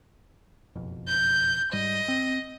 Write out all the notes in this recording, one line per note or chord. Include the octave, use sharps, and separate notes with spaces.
F#1 B1 F2
G6
G#2 G3 D#5
C4